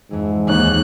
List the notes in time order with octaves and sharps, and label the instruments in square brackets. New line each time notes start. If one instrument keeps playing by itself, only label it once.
[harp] F2 E3 [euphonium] G#2
[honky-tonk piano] D#2 [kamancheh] F#6